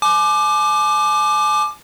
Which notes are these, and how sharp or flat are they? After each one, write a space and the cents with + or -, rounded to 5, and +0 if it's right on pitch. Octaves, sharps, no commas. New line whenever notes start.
G#5 +45 D6 +20